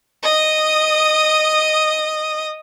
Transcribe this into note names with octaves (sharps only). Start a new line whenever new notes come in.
D#5 D#6